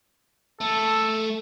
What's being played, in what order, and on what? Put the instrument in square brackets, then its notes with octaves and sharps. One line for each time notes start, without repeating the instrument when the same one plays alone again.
[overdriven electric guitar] A3 [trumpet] A4